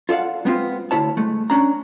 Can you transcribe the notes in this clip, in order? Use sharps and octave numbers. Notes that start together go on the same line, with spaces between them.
F4 A4 D5 F5 F#5
G#3 B3 C4 D#4 F4
D2 F#3 E4 C#5 A5
G#3 A3
C#4 D4 A#5